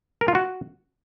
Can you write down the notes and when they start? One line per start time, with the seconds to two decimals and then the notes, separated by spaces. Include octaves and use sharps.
0.21 A#4
0.28 F4
0.35 F#4